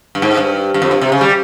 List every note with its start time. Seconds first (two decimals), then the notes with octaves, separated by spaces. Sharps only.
0.15 G2
0.22 G#2
0.37 G2
0.74 G2
0.82 F2
0.91 G2
1.01 C3
1.12 C#3
1.21 G3